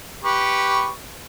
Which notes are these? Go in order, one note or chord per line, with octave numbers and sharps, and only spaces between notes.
G4 B4 C#6